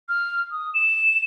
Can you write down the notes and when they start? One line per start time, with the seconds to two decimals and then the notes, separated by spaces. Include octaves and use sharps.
0.09 F6
0.51 D#6
0.74 E7